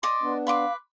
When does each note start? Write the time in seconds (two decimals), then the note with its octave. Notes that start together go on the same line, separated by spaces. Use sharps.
0.03 D5 D#5 C6 D6
0.22 B3 D4
0.47 B4 F5 C6 D6